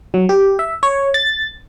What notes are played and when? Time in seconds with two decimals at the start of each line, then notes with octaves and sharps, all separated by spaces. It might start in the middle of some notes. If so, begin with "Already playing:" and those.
0.14 F#3
0.29 G4
0.59 E5
0.83 C#5
1.14 A6